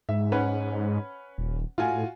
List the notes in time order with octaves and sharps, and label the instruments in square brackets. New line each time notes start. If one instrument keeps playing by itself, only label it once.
[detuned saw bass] G#2 [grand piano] E5
[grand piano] C#4 B4 F#5
[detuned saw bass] D#1
[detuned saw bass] A2 [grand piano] F4 F#4 G#5